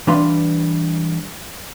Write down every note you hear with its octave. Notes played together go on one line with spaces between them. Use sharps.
E3 G3 D4 B4 F5 C6